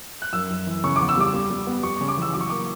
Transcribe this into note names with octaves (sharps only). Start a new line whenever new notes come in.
F#6
F#2 E6
F#2
E3
C#3 C#6
D6
E2
E6
G3 D6
G3
G3
B3
G3 C#6
C#6
C#3
D6
E3 E6
F#3 D6
C#6
A#3 D6